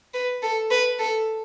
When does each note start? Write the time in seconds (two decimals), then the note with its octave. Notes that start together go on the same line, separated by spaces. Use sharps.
0.14 B4
0.43 A4
0.71 B4
0.99 A4